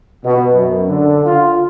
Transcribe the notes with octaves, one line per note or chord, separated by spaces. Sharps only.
B2
F#2
D3
F4